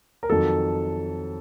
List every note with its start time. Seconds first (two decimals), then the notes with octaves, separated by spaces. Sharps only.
0.23 A#4
0.30 F2 D#3 F#3 A4